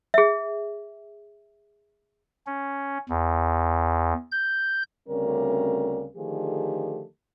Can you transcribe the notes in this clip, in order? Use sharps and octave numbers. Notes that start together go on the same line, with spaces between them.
G#4 E5
C#4
E2
G6
D2 C#3 G3 C4 C#4 A#4
D3 D#3 F3 A3 G4 G#4